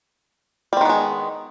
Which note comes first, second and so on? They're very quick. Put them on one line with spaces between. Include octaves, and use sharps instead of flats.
G3 C4 D#3 B3 G#3